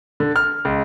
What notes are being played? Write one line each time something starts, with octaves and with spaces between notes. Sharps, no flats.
D3
F6
C#2